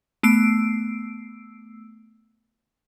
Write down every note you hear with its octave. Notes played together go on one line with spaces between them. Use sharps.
A3 B3 E6 C7 D7